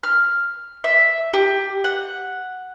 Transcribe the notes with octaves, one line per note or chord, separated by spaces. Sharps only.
F6
E5
G4
F#5